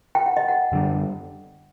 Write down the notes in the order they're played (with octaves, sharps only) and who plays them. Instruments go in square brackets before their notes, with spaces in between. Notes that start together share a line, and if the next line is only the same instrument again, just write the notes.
[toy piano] G5
F#5
D#5
F#5
[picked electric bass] F#2 D3 G3